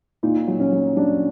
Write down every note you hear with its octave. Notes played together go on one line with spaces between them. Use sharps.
A#2 D#4
F#3
C#4
F#3
F#3 D4